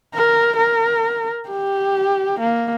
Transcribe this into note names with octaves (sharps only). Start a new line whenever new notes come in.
A#4
A#4
G4
A#3